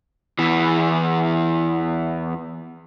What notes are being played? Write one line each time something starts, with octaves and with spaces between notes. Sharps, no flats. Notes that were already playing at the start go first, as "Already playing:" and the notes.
E2 E3